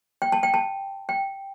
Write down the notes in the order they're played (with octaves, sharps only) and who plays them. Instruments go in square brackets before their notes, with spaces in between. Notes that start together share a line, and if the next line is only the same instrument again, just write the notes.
[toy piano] G5
A5
G5
A5
G5